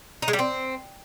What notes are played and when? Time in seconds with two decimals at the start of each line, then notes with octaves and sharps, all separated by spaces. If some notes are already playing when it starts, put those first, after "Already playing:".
0.22 D#4
0.28 G#3
0.33 G3
0.39 C4